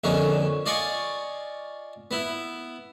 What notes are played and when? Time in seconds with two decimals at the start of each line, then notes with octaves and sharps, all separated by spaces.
0.04 A#1 F2 D3 C#4 D#4
0.66 F4 D5 D#5 G#5 C6 C#6
2.11 B3 E4